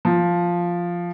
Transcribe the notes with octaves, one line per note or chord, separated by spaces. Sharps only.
F3